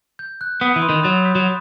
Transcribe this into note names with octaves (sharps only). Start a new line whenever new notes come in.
G6
F#6
B3 D#6
E3 B5
C6
D#3
F#3 F#6 A6
G6 B6
F#3